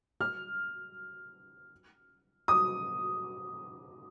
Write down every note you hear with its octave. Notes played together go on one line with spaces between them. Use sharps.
F6
D#6